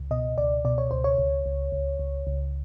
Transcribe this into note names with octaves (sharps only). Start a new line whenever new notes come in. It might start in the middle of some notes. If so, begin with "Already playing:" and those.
Already playing: C#2
B2 D#5
C#2 D5
B2 D5
C#5
C#2 C5
C#5
C#2
C#2
C#2
C#2
C#2